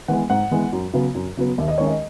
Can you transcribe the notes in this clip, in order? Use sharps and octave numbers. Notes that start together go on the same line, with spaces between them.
E3 G#3 B3 F#5
G#2 F#5
E3 G#3 B3
F#2
C#3 F#3 B3
F#2
C#3 F#3 B3
D#2 E5
D#5
D#3 G#3 C#4 C#5
D#5